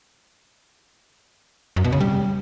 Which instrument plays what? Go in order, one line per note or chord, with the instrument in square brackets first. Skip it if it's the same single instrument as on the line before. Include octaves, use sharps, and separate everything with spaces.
[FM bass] F#2
B2
C#3
G3